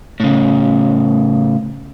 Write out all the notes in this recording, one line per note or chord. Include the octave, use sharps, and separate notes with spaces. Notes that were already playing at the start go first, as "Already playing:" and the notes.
A2 C#3